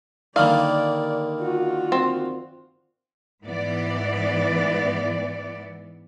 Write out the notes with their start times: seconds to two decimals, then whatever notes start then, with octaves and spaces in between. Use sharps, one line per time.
0.36 D3 D#3 G3 A#3 D5 F5
1.41 F4 F#4
1.92 C4
3.45 G#2 E3 B3 D5